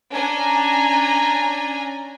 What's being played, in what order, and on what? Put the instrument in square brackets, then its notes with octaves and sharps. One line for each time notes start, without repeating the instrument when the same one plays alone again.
[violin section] C#4 D4 G#5 A#5